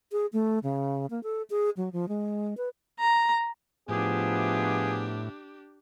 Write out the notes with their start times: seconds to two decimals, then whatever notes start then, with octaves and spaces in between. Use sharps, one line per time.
0.12 G#4
0.33 A3
0.63 C#3
1.10 A#3
1.23 A4
1.50 G#4
1.77 F#3
1.93 F3
2.09 G#3
2.57 B4
3.00 A#5
3.89 A2 F3 B3 D4 G4 G#4 E5